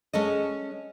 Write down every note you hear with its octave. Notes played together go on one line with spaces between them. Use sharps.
G#3 C#4 A4 D#5